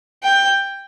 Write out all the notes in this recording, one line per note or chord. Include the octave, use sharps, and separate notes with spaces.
G5